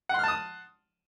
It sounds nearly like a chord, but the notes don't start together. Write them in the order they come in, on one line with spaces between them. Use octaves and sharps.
F#5 C6 F6 A5 D#6